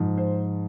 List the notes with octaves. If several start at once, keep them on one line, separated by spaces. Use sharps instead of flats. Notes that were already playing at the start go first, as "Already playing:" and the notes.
Already playing: G#2 F3
C5